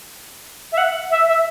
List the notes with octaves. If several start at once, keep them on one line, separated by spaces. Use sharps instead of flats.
E5
F#5
E5
E5